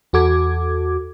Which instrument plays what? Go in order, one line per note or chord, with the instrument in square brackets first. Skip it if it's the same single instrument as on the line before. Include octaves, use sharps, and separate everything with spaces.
[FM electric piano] E2 F#4 A4 D6 G#6